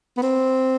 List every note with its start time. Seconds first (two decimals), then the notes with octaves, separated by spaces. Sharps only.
0.17 B3
0.22 C4